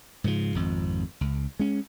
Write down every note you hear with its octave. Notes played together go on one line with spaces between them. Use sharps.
G#2 C#3 E3 F3
G#1 F2
C#2
G#3 C#4